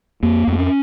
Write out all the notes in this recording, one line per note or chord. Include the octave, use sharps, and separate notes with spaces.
F2 A#3
F2
A#3
C#4